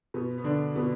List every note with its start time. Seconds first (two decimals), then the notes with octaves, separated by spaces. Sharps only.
0.14 B2 B3
0.38 B3
0.44 D3 D4
0.75 B2 B3